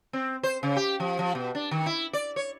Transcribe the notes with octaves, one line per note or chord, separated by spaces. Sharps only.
C4
C5
C#3
G4
F3
F3
B2
D4
D#3
E4
D5
C#5